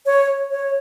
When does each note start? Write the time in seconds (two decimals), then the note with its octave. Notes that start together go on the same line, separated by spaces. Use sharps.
0.06 C#5
0.50 C#5